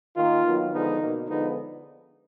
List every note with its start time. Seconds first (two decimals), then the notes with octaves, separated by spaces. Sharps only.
0.16 D#3 A#3 F4
0.44 D#3 F#3 B3
0.72 D3 F3 G#3 B3 D#4
1.00 B2 A#3
1.28 D3 F3 G#3 B3 D#4